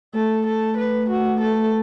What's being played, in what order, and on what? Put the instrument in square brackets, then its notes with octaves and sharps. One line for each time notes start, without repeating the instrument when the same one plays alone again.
[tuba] A3 [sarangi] A4
[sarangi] A4
B4
F#4
A4